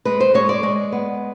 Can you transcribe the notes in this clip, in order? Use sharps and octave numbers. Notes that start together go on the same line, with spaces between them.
G#3 B4
C5
G#3 C#5
D5
G#3
B3